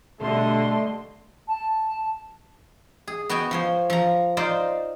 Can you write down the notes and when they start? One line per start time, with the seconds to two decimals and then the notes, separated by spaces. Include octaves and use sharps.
0.21 B2 D3 G3 A3 D#5 C6
1.48 A5
3.08 G#4
3.29 B3 F#4 G5 G#5
3.51 F3 C5 C#5
3.90 F3 A#5
4.37 D#4 F4 C5 D5